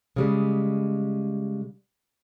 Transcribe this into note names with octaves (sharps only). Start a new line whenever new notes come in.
C#3 G3 G#3